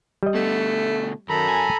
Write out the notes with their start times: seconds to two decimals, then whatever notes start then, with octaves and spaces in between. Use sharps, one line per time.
0.23 G3 D#5
0.34 B2 D3 A3
1.30 F#2 D#3 A4 A#5 B5
1.48 G#5